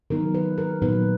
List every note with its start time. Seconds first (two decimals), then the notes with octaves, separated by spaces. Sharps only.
0.10 D#3 F#3 B3 D#4 A#4
0.35 B4
0.58 A#4
0.82 A#2 F#3 B3 D#4 B4